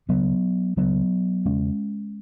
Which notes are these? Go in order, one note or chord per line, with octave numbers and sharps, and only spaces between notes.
C#2 C#3 F#3 B3
C#2 C#3 F#3 B3
E2 C#3 G#3 C#4